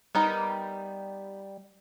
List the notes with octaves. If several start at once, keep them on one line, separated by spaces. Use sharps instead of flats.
G3 B3 D#4 A#4